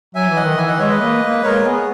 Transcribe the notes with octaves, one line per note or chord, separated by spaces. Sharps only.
F#3 E5 G#5
E3
D#5 F#5
D#3
E3 E5 G#5
D#5 F#5
G#3 C#5 E5
B4 D#5
A#3
A#3
G#3 A#4 C#5
B3 G#4